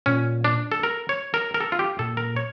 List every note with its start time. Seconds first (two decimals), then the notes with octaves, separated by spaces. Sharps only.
0.06 A#2 C#4
0.44 D4
0.72 A4
0.83 A#4
1.09 C#5
1.34 A#4
1.54 A#4
1.61 A4
1.72 F4
1.79 G4
1.99 A#2 A4
2.17 A#4
2.36 C#5